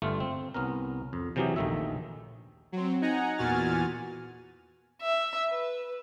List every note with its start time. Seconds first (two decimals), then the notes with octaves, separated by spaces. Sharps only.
0.02 G1 G2 A3 F4
0.20 C4
0.54 C2 B3 C#4 A#4
1.13 F2
1.36 C3 E3 F#3 C#4 G4 G#4
1.56 A#1 D#2 D#3 A3 E5
2.72 F#3 C4
3.02 D#4 F#5 G#5 A#5
3.37 E2 A#2 F#4 G#5 F6 A6
5.02 E5
5.49 B4